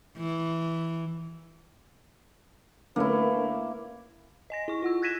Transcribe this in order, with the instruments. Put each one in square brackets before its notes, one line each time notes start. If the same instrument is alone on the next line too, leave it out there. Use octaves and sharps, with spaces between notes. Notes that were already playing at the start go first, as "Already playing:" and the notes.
[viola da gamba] E3
[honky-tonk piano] D3 A3 C#4 [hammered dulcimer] A#3 E4 [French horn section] A#4 B4
[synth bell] D#5 G#5 A#6
E4 C#6
F4 F#5 E6
F#6 G#6 A#6 B6 D#7 E7